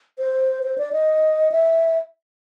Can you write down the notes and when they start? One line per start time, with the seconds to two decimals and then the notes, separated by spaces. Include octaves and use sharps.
0.19 C5
0.63 C5
0.78 D5
0.93 D#5
1.52 E5